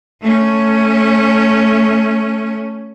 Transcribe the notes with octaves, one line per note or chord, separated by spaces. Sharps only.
A3 C#4